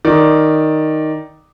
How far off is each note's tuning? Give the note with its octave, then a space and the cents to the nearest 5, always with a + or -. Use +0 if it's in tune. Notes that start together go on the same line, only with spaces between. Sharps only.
D#3 +0 D5 +0